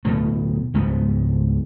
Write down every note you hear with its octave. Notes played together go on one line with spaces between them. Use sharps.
D1 B2 A3
C#2 G#2 G3 B3